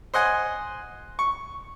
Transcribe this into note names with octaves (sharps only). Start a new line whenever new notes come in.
C5 D#5 F#5 G#5
C#6